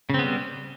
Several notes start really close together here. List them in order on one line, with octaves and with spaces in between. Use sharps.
C#3 C4 B3 G3